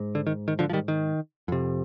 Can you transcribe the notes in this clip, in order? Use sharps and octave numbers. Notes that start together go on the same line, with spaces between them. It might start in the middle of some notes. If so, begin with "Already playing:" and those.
Already playing: G#2
D3
D#3
D#3
D3 F3
F3
D#3 G3
D#3
F2 C3